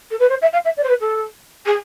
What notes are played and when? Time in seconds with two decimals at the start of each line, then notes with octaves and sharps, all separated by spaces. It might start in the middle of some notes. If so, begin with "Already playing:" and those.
0.10 A4
0.19 B4
0.29 C5
0.41 E5
0.52 F5
0.64 E5
0.77 D5
0.83 C5
0.89 B4
1.00 A4
1.65 G#4